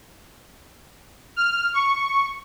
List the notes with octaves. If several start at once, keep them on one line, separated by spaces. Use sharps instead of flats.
F6
C#6